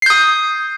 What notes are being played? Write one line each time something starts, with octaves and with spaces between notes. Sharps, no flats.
D#6 G6 C7